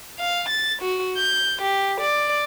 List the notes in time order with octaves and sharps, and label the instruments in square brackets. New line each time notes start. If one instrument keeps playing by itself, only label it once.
[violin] F5
A6
F#4
G6
G4
D5